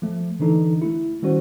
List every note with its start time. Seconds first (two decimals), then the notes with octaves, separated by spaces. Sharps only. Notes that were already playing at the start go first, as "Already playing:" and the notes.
0.02 F3 A3
0.39 D3 E3 D4 D#4 A4
0.82 A3 E4
1.22 D#3 G3 C#4 F#4 C5